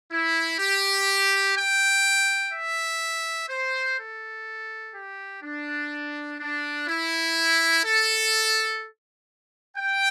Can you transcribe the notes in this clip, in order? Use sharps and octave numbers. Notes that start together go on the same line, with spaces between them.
E4
G4
G5
E5
C5
A4
G4
D4
D4
E4
A4
G5